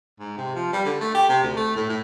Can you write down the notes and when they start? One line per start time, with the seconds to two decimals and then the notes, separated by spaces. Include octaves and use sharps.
0.20 G#2
0.37 C3
0.55 F3
0.73 G3
0.85 D3
1.00 A3
1.14 G4
1.29 C3
1.43 D2
1.56 A3
1.76 A2
1.89 A2